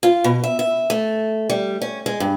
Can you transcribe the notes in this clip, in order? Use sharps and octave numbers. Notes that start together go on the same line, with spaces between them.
F4
B2
E5
E5
A3
G3
C#4
G#3
G2